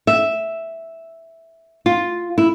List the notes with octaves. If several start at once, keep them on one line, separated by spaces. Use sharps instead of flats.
E5
F4
E4